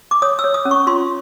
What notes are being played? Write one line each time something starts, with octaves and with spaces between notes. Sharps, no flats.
D6
C#5 D#6
E6
C#5
D#6
C#4
C#6
F4 C6